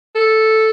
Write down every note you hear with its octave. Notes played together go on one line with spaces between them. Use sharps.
A4